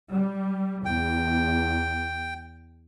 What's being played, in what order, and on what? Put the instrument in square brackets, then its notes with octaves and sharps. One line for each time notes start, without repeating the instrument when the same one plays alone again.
[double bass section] G3
[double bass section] E2 [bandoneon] G5